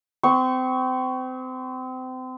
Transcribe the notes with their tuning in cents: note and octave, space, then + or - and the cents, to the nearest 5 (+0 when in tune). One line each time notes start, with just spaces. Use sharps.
C4 -30 C#6 +0